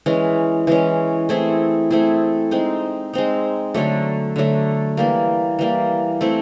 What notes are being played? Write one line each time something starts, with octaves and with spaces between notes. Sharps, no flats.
E3 G#3 C#4
E3 G#3 C#4
A3 C4 E4 G#4
A3 C4 E4 G#4
G#3 C4 D#4
G#3 C4 D#4
D3 F#3 A3
D3 F#3 A3
E3 G3 A#3
E3 G3 A#3
A3 C4 E4